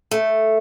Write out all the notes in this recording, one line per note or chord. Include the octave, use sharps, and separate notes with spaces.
A3